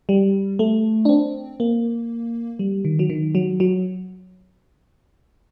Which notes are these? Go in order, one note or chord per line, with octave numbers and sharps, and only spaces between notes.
G3
A3
D4
C4
A#3
G3
D#3
F#3
D#3
F#3
F#3